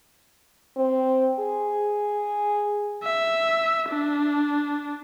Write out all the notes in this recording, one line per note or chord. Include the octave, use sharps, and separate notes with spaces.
C4
G#4
E5
D4